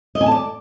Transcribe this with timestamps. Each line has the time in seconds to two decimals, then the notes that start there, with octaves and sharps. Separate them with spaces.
0.15 D#5
0.21 G#5
0.26 A5
0.32 D5